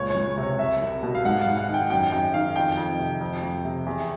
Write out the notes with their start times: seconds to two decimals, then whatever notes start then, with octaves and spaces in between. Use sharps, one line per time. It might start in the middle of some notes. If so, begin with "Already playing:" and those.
Already playing: C#2 A#2 C#5
0.10 C#5
0.15 C#2
0.37 C3
0.43 C#5
0.59 C2 E5
0.81 C2
1.03 B2
1.15 F5
1.25 G#2 F#5
1.41 G#2 F5
1.57 F#5
1.69 D#3
1.74 G5
1.90 F#2 G5
2.12 F#2 G5
2.34 D#3 F5
2.56 F2 G5
2.77 F2
2.99 C3
3.21 F2
3.43 F2
3.65 C3
3.86 E2